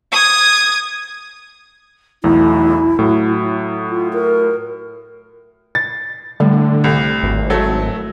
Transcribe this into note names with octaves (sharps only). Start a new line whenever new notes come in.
D#6 G#6
B1 E2 A3 E4
A2 F#3
F4
A#4
A6
A2 D3 G3 A3
C2
G#1
F#3 A3 A4